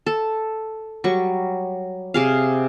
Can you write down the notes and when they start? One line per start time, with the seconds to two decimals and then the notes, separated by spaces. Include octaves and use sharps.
0.07 A4
1.04 F#3 G3 C#6
2.14 C3 G#4 F5